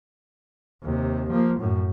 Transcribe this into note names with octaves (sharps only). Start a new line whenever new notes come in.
D#2 C3
F3 A#3
F#2 A2